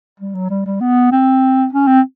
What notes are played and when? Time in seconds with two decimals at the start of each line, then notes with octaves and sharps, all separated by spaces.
0.20 G3
0.35 F#3
0.50 G3
0.66 G3
0.81 B3
1.12 C4
1.73 C#4
1.87 C4